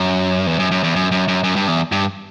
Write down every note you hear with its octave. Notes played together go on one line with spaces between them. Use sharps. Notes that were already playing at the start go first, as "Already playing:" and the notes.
Already playing: F#2
E2
F#2
F#2
E2
F#2
F#2
F#2
F#2
G2
E2
G2